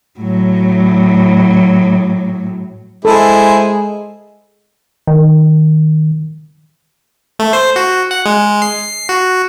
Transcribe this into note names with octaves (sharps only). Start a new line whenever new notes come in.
A2 F#3
G#3 E4 G#4 A4 C5
D#3
A3
C5
F#4
F#5
G#3
C7
F#4